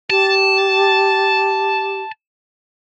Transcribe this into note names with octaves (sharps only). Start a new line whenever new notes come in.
G4 A5